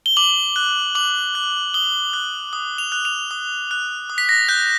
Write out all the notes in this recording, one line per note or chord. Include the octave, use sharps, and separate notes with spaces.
G7
D6 F#7
F#6
D6 F#7
F#6
D#6 G7
F#6
D#6
F7
F#6
F7
D#6
F#6
D#6
B6
A#6
F#6 G6